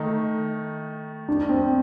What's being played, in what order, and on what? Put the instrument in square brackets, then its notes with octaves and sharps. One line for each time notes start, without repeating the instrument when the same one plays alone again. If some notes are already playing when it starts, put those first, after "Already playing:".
Already playing: [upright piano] D#3 A3 D#4
[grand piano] D4
C4